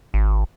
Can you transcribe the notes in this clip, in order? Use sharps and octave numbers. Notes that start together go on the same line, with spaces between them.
G#1